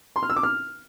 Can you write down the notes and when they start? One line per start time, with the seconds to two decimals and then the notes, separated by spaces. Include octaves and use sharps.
0.16 C6
0.23 F6
0.30 E6
0.36 D6
0.43 F6